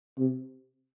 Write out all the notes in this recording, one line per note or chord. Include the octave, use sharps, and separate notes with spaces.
C3